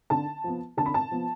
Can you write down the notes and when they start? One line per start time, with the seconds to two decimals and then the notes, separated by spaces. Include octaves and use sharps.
0.10 D3 A5
0.44 F3 B3
0.77 D3 A5
0.86 B5
0.94 A5
1.11 F3 B3